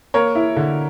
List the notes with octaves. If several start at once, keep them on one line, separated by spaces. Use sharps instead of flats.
A#3 A#4 C#5
E4
D3